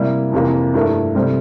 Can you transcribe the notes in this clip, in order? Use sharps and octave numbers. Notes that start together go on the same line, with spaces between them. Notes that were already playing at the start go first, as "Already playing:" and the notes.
Already playing: C3 G3 A#3 E4
F2 C3 E3 A#3
G2 F3 A3 E4 A#4
C3 G3 C4 E4 A4